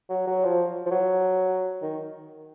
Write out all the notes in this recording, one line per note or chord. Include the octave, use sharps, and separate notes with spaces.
F#3
F#3
F3
F3
F#3
D#3